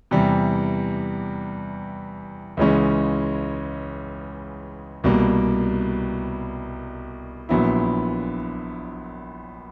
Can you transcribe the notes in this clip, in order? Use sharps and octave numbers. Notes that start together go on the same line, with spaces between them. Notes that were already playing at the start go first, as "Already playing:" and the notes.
E2 C3 E3 G3
C#2 C#3 E3 G#3 C#4
C2 B2 G3 A#3
A#1 A#2 F#3 B3 E4